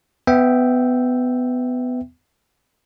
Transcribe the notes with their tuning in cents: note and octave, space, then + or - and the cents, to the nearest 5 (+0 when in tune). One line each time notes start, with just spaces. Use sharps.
B3 +20 E5 +0 G5 +0